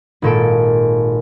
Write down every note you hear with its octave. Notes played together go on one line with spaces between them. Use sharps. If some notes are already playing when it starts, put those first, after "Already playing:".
G#1 A#2 A4 D7